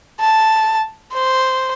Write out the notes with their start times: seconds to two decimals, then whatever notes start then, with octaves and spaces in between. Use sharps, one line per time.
0.21 A5
1.14 C5